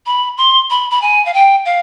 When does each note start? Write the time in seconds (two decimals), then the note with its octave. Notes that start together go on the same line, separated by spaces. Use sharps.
0.06 B5
0.37 C6
0.70 B5
0.90 B5
1.01 G#5
1.25 F5
1.33 G5
1.65 F5